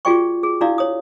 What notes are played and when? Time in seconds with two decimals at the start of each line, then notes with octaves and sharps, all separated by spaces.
0.05 F4 F#4 G#4 D5 G5 C#6
0.43 G#4
0.61 D4 E4 F#4 D5 F5 D#6
0.78 C#5 D#6